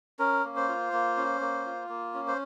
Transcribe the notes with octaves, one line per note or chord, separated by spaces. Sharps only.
C#4 A#4
A#3
C5
F4
A#3
C#4
A#3
F4
A#3
C#4
C5